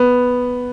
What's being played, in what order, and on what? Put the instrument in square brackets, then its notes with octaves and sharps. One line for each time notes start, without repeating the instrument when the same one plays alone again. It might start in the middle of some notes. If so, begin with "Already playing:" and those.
Already playing: [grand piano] B3